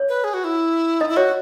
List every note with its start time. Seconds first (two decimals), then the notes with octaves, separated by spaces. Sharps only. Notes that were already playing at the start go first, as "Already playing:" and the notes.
Already playing: C#5
0.09 B4
0.24 G#4
0.34 F#4
0.44 E4
1.00 D#4 D#5
1.09 E4
1.17 F#4 C#5